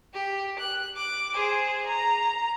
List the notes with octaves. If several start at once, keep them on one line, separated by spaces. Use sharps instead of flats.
G4
F#6
D6
G#4 C5
A#5